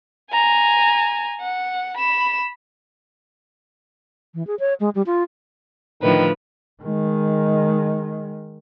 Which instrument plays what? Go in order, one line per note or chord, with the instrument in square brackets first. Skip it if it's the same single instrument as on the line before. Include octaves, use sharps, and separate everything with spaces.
[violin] G#5 A#5
F#5
B5 E7
[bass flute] E3
G#4
C#5
G#3
G3
F4
[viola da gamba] A2 D3 F3 [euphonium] D#3 [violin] B4
[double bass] D#3 G#3